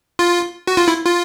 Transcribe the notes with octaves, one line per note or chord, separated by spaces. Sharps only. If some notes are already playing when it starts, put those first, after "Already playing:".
F4
F#4
F4
E4
F4